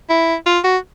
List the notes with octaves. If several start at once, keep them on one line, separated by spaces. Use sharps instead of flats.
E4
F4
F#4